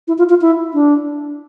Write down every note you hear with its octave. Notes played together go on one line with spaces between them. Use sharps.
E4
F4
F4
E4
D4